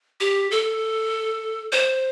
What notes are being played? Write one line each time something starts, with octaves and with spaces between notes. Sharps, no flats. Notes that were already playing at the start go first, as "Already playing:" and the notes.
G4
A4
C5